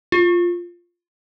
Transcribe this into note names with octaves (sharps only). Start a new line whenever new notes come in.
F4